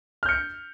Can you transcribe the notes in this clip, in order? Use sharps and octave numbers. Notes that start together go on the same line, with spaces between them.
F6 G6 C#7